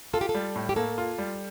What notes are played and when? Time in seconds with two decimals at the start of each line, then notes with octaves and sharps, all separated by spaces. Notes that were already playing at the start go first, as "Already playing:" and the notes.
0.13 F4 A4
0.21 G4
0.29 A4
0.35 G3
0.56 A2
0.69 G4
0.76 A#3 A4
0.98 F4
1.18 G3